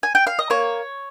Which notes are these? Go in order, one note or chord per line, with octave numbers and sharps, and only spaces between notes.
G#5
G5
F5
D#5
A#3 C#5